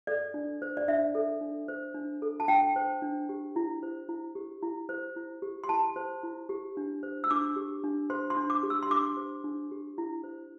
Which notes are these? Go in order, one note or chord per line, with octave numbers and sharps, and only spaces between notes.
A4 D5
D4
C5
D5
D4 E5
A4
D4
C5
D4
A4
A5
D4 G5
C5
D4
G4
E4
C5
E4
G4
E4
C5
E4
G4
C6
E4 A5
C5
E4
G4
D4
C5
E6
D4 D6
G4
D4
C5 C6
C6
D4
D6
G4
E6
C6
D4 D6
C5
D4
G4
E4
C5